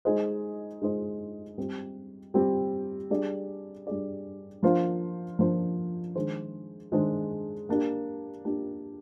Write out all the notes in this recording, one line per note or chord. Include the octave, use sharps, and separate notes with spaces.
G#3 D#4 G#4 C5 D#5
G#3 D#4 G#4 C5 D#5
G3 C4 G4
G3 C4 G4
G3 D4 G#4 D5
G3 D4 G#4 D5
F3 A#3 D4 F4 C5
F3 A#3 D4 F4 C5
D#3 G#3 D4 G#4 C5
D#3 G#3 D4 G#4 C5
A#3 D4 G4
A#3 D4 G4